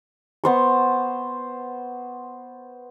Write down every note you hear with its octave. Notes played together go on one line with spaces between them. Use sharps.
B3 C5 C#6